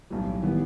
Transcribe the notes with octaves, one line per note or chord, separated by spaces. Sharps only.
B1 A2 E3 G3
A2 D#3 E3 G3 B3